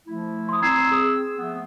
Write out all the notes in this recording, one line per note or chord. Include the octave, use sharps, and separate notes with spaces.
F3 A3 E4
C6 D#6
C4 A#5 E6 G#6 C7
G#4 D#6
F3 A3 B3